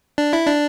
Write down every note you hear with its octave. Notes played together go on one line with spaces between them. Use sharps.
D4
E4
D4